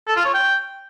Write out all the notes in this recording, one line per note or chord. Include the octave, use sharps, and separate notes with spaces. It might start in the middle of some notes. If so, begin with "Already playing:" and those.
A4
F4
C#5
G5